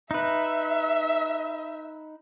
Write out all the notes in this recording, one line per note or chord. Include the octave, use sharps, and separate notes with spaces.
D#4 B4 E5